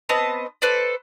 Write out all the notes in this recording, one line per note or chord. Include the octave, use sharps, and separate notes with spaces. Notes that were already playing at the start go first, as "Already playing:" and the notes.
B3 C4 D#5 A5
A4 B4 C5 D5